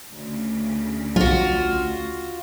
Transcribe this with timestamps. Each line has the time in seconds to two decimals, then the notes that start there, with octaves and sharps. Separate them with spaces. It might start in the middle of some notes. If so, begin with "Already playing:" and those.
0.12 D2 C#3
1.16 B1 F4 F#4